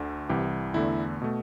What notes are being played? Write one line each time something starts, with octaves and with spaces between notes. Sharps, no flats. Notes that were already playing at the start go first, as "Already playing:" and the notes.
Already playing: D2 D3 A3
C2 C3 E3 G4
E2 D3 A3 E4
B2 A3